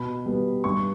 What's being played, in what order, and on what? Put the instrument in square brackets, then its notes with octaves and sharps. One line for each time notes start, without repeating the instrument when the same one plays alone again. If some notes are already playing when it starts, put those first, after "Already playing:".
Already playing: [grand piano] B2 B5
G3 B3
G2 C#6